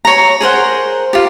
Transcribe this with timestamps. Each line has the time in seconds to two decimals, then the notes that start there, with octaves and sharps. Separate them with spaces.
0.05 C#5 A#5
0.40 G#4 A#4 C5 F#5
1.13 F4 G4